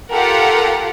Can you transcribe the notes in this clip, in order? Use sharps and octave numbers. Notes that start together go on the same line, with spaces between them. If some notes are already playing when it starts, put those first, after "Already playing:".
F4 G4 A4 A#4 F#5